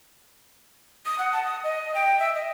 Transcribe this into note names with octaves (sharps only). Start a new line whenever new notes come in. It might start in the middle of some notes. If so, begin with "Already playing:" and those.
D#6
F#5
A5
D#6
D#5
G5
E5
D#5